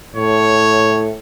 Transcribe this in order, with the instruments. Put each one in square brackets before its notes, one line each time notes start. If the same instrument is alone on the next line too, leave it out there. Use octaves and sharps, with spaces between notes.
[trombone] A2 [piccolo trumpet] C#5